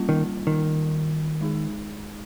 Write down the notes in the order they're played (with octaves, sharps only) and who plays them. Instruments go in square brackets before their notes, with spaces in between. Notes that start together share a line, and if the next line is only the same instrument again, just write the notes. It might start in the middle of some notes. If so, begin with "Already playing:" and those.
Already playing: [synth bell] G3 A#3 C#4 F4
[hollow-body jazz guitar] D#3
D#3
[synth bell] G#3 D#4 G#4